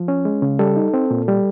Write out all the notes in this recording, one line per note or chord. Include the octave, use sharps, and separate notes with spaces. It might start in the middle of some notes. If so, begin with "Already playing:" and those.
Already playing: F3
C#4
G#3
C#3
G3 A4
D#4
C4
A#2
G3